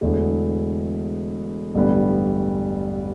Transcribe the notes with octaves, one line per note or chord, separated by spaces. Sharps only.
E1 E2 D3 A3
A1 G2 D3 G3 B3